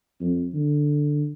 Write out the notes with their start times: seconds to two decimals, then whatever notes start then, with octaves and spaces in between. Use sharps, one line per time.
0.20 F2
0.54 D3